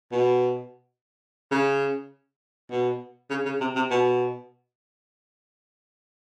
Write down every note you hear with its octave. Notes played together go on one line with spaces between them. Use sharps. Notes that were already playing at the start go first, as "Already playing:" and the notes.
B2
C#3
B2
C#3
C#3
C3
C3
B2